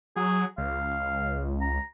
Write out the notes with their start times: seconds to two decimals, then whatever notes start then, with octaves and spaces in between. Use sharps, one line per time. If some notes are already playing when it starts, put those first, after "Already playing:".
0.16 F#3 G#4
0.58 C#2 F5
1.61 A#5